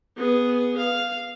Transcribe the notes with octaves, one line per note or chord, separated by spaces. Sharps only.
B3 G#4
F5